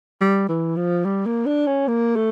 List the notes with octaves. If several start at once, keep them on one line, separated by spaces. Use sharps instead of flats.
G3
E3
F3
G3
A#3
D4
C#4
A#3
A3